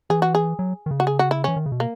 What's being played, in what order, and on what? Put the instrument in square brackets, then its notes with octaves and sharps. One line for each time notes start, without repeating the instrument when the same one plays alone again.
[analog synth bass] E3 [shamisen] G#4
[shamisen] F#4
G#4
[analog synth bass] F#3
D#3
C#3
[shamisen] F#4
G#4
F#4
E4
[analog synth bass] E3 [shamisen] C#4
[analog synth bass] D#3
C#3
B2
[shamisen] A#3